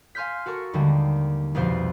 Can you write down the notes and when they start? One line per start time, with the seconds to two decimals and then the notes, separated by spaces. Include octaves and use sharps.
0.15 F5 G#5 C6 F6 G6 B6
0.46 F#4 A4 A#4 C#6
0.73 D#2 D3 G3 G#3 A#3
1.55 C2 F2 B2 F3 C5